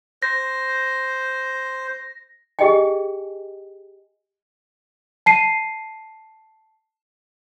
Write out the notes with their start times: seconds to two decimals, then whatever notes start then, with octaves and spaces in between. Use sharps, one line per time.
0.23 C5 A#6
2.59 G4 G#4 D#5 G5 G#5
5.26 A5 C7 D#7